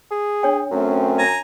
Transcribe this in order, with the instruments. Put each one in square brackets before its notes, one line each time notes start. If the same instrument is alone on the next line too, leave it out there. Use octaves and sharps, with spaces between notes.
[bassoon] G#4
[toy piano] D4 C#5 G5
[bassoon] F#2 [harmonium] A3 C4 C#4
[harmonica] G#5 A#5